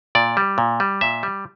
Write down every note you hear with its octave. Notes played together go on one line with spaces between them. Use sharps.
A#2 D5
G3
A#2
G3
A#2 E5
G3